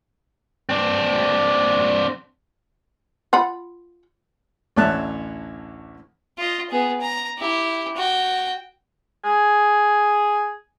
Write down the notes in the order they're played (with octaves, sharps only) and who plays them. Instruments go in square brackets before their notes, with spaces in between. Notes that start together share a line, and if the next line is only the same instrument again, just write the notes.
[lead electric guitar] C4 D4
[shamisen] F4 F#5 B5
[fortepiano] A1 D2 C#5 E5 A5 F#6
[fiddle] F4 D#5
B3 G#4
A#5
E4 G4
F#4 G5
[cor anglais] G#4